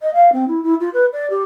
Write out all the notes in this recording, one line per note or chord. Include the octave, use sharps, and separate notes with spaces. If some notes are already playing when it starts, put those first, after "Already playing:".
D#5
F5
C4
E4
E4
F4
B4
D5
G4